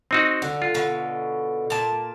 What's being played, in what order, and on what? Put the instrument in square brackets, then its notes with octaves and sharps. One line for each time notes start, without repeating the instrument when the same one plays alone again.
[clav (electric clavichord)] C4 D#4 F#4
[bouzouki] D3
[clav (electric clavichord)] F4
[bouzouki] B2 D3
A#2 A5